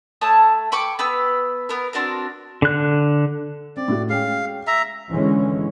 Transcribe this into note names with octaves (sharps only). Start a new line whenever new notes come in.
A3 C#5 A5 D#6
G5 B5 C#6 D6
B3 B4 E6
B3 A#4
C4 D4 F#4 A#4
D3 F#6
C4 D5
A2 F#4
G#3 C#4 F5 G5
E5 A#5
D3 E3 G#3 C#4